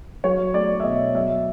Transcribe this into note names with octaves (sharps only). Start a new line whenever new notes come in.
F#3 C#5
A3 D5
E5
B2 D#5
F#3 E5